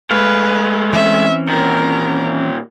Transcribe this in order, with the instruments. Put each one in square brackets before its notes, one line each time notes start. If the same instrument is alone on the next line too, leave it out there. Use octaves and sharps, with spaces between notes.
[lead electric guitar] G#3 A3 [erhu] B4 [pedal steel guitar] F5
[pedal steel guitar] E3 C4 C#4 [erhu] E5
[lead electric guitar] A#2 D#3 [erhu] A#4